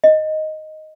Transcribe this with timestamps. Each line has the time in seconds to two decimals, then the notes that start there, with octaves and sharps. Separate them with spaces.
0.04 D#5